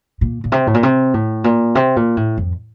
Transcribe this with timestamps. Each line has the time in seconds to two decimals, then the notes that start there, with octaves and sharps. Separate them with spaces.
0.21 A#2
0.44 A#2
0.52 C3
0.67 A2
0.74 A#2
0.83 C3
1.14 A2
1.44 A#2
1.75 C3
1.96 A#2
2.17 A2
2.38 F2